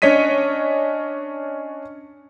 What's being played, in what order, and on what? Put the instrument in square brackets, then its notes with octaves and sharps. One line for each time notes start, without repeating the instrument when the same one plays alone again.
[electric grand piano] C#4 D4 C#5 D#5 B6 D#7